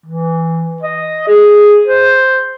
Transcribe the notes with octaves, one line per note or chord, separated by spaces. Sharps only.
E3
D#5
G#4
C5